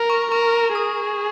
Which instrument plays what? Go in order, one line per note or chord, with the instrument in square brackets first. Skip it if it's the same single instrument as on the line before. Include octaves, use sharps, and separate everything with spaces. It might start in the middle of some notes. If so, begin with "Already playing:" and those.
Already playing: [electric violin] A#4
[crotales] C#6
[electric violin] A#4 [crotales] C#6
[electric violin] G#4 [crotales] D#6